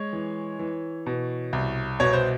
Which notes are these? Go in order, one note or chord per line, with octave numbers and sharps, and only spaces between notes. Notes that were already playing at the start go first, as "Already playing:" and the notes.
Already playing: G#3 C#5
E3
E3
B2
C2
B2 C#5
C5